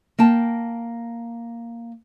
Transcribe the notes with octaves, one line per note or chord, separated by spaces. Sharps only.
A#3 G5 A5